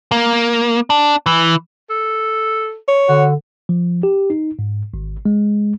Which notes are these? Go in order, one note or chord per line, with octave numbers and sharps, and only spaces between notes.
A#3
D4
E3
A4
C#5
D3 F#4
F3
G4
D#4
G#2
G#1
G#3